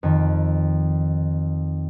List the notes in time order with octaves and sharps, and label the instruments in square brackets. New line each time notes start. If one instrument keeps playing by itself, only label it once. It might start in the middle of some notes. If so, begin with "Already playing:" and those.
[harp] F2 D#3